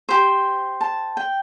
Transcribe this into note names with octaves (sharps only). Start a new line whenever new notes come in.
G4 C5
A5
G5